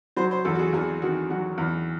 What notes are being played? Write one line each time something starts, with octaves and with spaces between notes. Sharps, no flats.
F#3 C5
C5
E2 A4
F#4
G#4
E2 G#4
D#3 F#4
F#3 F#4
E2